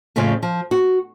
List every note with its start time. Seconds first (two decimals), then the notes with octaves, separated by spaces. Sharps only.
0.16 F2 A2 C#3 F3 C#4 F4
0.43 F3
0.71 F#4